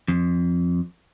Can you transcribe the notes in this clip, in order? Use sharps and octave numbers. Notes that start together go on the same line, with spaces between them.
F2